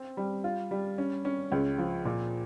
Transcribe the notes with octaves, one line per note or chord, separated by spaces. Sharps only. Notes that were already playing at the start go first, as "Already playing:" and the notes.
Already playing: C4
G3
F4
G3
C#4
C#4
C#2
F3
A#2